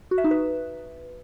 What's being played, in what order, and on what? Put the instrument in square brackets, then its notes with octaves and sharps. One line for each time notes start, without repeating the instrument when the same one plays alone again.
[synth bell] F#4
E5
D#4
B4